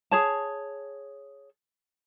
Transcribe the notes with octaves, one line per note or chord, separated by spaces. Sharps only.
G#4 C#5 A5